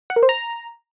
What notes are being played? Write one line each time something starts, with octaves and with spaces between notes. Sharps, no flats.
F#5
A#4
C5
A#5